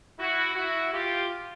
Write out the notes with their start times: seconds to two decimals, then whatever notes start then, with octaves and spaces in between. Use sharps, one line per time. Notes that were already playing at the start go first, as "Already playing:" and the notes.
0.19 E4 F#4
0.55 E4 F#4
0.93 F4 G4